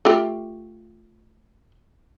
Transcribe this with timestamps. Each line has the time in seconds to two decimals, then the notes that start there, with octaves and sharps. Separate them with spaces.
0.05 A3 F4 G4